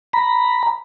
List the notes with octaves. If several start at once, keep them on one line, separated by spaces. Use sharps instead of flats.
A#5 B5